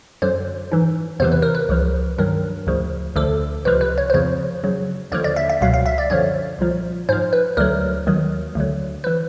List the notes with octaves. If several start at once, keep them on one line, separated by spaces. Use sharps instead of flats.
F#2 D3 F#3 C5
G#2 E3
E2 C3 E3 C5
B4
A#4
B4
C#2 C#3 F3
G2 D#3 F#3 A#4
D2 C#3 F3
D2 D3 F3 A4
C#2 C3 F3 B4
B4
C#5
C5
F2 C#3 F3 C#5
F#2 C#3 F#3
D#2 D3 F3 C#5
D5
E5
E5
C#2 B2 F#3 F5
F5
E5
D5
F#2 D3 F3 C#5
C2 A#2 F3
G#2 F3 C5
B4
D2 D3 F#3 A#4
D#2 D#3 F#3
D2 D3 F#3
E3 B4